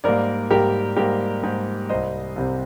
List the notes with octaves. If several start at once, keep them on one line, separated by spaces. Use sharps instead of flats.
G#2 G3 A#3 A#4 D5
G#2 G3 A#3 G4 A#4
G#2 G3 A#3 G4 A#4
G#2 G3 A#3
C2 C3 G3 C5 D#5
C2 C3 G3